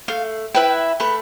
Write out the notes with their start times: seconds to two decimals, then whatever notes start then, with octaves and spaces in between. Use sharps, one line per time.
0.08 A3 F5
0.54 E4 B4 E5 G5
1.00 A3 B4